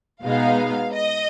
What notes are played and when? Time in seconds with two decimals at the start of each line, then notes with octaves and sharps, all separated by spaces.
0.23 B2 G#3 B3 D#4 F5
0.93 D#5